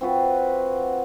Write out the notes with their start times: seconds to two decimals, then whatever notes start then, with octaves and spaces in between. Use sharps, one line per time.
0.01 C4 F4 F#4 B4